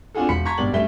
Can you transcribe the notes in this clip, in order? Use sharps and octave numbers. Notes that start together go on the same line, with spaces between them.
C4 D4 F4 F#4 G#4 A4
E1 B5 B6 C#7
A5 A#5 C#6 G6 G#6 B6
G#1 G2 B2 D5 G5 F#7
G2 C#3 A3 E5 B6 G7